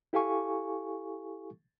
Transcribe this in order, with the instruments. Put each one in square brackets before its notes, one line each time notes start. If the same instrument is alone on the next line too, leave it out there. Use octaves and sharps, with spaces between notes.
[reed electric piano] E4 G4 A4 F5 G#5 C#6